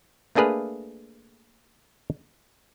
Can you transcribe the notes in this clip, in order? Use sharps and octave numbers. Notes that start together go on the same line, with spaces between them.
A3 A#3 D4 G#4 B4 F5